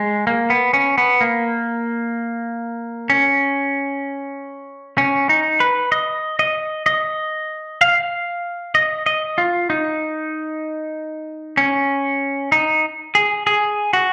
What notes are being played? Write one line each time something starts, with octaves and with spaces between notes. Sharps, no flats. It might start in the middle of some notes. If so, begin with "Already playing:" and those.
Already playing: G#3
A#3
B3
C#4
B3
A#3
C#4
C#4
D#4
B4
D#5
D#5
D#5
F5
D#5
D#5
F4
D#4
C#4
D#4
G#4
G#4
F#4